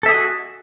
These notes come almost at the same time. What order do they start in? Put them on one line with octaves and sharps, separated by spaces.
A4 E5 G#4 D#5 F#4